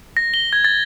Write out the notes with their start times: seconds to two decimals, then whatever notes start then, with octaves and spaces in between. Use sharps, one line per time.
0.17 A#6
0.34 G7
0.53 G#6
0.65 A6